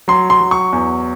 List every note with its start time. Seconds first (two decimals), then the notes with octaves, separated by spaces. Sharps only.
0.08 F#3 C6
0.30 C6
0.40 F#3
0.51 C#6
0.73 E2